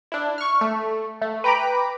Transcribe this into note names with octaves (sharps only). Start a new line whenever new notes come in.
D4 E4
C#6 F6
A3
A3
B4 G5 A#5 B5 D6